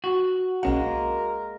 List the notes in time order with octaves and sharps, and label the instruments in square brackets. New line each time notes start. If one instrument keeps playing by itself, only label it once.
[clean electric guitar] F#4
[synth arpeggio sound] B1 C#4 F#5 [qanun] G#3 A#3 [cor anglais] A#4